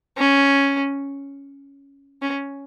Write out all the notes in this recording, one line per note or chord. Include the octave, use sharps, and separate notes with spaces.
C#4
C#4